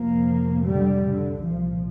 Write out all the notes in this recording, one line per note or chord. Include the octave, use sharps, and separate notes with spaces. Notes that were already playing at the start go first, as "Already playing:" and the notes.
Already playing: F2 C3 F3 A#3
D3 G3
D3
C2 A#2 F3